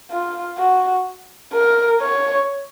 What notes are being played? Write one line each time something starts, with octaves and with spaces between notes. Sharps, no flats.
F4
F#4
A#4
C#5